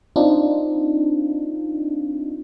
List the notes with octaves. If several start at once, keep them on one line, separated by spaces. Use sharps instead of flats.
C4 D4 D#4 F4